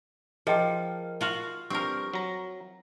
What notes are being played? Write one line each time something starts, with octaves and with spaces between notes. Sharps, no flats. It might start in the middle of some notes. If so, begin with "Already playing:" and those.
F3 G#4 A#4 D#5 G5
F4 F#4 F5
G2 C4 A#4 C#6
F#3 A#5